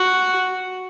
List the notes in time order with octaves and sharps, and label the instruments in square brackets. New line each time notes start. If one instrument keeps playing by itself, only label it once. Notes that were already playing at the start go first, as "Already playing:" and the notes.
Already playing: [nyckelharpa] F#4